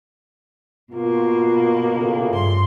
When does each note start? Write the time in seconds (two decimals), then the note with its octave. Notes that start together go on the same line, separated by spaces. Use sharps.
0.93 B2 A#3 F4
1.93 A2 C#3 F4
2.33 G2 C6